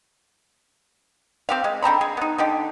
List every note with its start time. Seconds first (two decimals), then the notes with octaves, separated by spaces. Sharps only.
1.49 C4 G4 F5
1.64 G#3
1.82 D3 C4 A#5 B5
2.01 G#4
2.17 B3 D#4
2.38 D3 D#4 G4